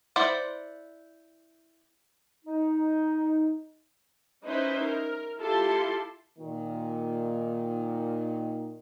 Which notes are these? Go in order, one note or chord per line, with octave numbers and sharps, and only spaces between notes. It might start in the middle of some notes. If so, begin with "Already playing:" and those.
E4 C5 D5 F#5
D#4
C#4 D#4 E4 B4 C5
A#4
E4 F4 G4 A4 A5 C6
A#2 D#3